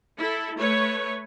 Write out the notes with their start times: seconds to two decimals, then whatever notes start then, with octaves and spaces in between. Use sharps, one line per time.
0.17 E4 A4
0.59 A3 B4 C#5